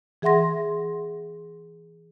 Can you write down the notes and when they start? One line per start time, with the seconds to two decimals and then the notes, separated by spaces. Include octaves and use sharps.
0.22 E3 G#4 E5 F#5 C6 A#6